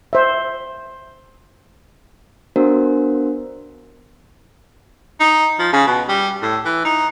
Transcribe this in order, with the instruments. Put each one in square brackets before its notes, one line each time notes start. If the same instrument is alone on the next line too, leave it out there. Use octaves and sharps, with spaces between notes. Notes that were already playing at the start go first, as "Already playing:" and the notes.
[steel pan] C5 E5
[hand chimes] B3 D4 F#4 A#4 C5
[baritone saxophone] D#4
F3
C#3
B2
G3
A2
E3
D#4